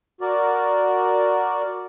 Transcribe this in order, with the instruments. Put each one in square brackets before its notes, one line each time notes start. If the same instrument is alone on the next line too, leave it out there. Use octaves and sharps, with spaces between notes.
[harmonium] F#4 A#4 D5